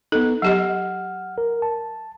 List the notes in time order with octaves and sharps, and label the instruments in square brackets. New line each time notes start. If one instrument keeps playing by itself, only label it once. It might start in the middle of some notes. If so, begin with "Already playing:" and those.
[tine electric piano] B3 D#4 [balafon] A4
[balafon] F#3 G4 D#5 [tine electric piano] F#5 F6
[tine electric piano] A#4
A5